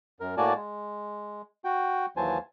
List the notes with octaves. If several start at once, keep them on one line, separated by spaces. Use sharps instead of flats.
F#2 A#4
A2 A#3 F#4 D5 G#5 A5
G#3
F#4 G5
D#2 E3 F#3 C5 G#5 A5